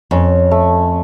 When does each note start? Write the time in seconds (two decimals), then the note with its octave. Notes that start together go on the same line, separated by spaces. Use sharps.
0.11 F2 C#4
0.51 A3